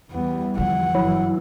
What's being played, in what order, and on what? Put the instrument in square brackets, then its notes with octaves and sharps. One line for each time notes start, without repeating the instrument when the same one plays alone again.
[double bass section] E2 E3 G3 [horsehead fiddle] B3
[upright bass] D3 F3 [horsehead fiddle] F#5
[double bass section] G1 F#2 E3 [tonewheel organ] F#3 E4